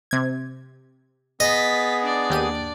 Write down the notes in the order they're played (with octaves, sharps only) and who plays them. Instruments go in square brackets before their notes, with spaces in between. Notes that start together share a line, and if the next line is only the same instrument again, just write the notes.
[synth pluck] C3 G#6
[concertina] B3 G#4 [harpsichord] D#5 [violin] A6 B6
[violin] D4 D5
[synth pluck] D#2 G4 D#7